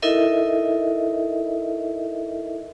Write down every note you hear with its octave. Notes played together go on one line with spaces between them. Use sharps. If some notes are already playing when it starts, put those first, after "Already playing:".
D#4 E4 A4 A#4 D#5 E5